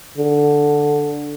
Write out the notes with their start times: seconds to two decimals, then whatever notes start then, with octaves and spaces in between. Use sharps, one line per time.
0.18 D3